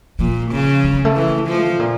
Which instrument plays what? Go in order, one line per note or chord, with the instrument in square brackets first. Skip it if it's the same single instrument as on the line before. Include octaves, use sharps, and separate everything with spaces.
[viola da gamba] A#2 [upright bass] F3
[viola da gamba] C#3
[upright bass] G3
G3
A3
[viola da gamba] E3
F3
[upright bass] A2
A#2